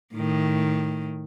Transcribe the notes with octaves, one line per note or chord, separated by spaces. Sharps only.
A2 D#3